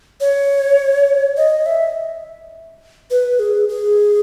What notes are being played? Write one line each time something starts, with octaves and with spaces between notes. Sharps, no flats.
C#5
D#5
E5
B4
G#4
G#4